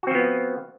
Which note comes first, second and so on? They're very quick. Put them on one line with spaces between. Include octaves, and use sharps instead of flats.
F#4 C4 F3 B3